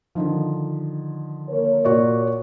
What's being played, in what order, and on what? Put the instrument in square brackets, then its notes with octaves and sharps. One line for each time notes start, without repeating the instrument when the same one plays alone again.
[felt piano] D3 D#3 F3
[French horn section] A#3 A#4 C#5
[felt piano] A#2 F#4 D5